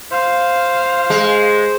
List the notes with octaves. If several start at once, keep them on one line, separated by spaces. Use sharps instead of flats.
C5 F5
G#3